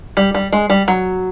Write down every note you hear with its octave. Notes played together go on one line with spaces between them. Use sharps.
G3
G3
G#3
G3
F#3